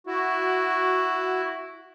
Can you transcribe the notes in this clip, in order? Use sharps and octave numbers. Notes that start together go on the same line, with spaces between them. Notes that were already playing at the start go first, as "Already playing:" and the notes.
E4 F#4